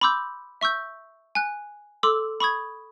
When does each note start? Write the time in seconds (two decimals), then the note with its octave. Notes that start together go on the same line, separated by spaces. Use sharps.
0.01 B5 C6 D6 E6 G6
0.61 E5 C#6 E6 G6
1.35 G#5 F#6
2.03 A4 C6 D6 E6
2.40 B5 C#6 D#6 G#6